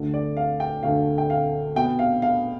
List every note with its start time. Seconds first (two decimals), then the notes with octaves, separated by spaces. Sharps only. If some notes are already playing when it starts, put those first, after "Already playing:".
Already playing: D2 D3 A3
0.14 D5
0.37 F5
0.60 G5
0.83 D2 D3 A3 F5
1.18 G5
1.30 F5
1.76 B2 B3 G5
1.99 F5
2.22 F5